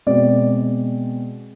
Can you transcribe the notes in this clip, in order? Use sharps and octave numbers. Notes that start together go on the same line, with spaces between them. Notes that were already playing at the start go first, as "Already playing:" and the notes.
B2 G#3 C4 D5